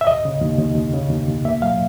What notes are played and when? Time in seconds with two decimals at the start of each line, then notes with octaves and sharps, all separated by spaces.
0.01 E5
0.07 D#2 D#5
0.25 C#3
0.42 D#2
0.59 D#2
0.76 D#2
0.94 C#3
1.10 D#2
1.27 D#2
1.45 A#3 E5
1.62 F#3 F5